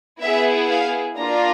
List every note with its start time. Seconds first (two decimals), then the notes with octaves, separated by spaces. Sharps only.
0.22 B3 E4 G#4 E5
0.70 F5
1.17 A#3 D4 F4 A#5